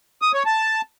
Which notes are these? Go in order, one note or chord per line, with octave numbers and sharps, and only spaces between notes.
D#6
C#5
A5